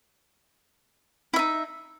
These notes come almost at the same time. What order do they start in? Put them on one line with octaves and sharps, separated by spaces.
E4 E5 D#4